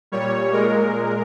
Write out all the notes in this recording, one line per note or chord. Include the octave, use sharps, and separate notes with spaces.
A#2 G3 C#5
A#2 G#3 A#4